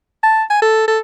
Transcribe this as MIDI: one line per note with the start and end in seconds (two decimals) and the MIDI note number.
0.24 0.43 81
0.50 0.58 80
0.62 0.87 69
0.88 0.99 69